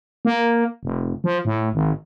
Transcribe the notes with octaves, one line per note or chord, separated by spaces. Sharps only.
A#3
F1
F3
A2
G#1